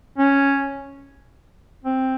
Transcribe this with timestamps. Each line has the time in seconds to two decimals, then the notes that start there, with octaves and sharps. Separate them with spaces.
0.18 C#4
1.84 C4